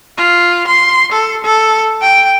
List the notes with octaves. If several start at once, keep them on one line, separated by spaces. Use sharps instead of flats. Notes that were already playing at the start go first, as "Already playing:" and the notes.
F4
C6
A4
A4
G5